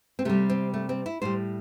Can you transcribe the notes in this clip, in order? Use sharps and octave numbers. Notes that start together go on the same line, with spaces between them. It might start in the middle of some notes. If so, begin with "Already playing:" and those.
C4
C3 G3 A3
C4
A3
C4
E4
A2 G3 C5